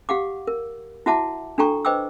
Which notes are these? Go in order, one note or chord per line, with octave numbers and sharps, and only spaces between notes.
G4 F5 F#5 D6
A#4
E4 F#4 E5 F#5 A5 D6
D4 F#4 A4 G5 A#5 C#6
B4 C5 D#5 G5 D6 E6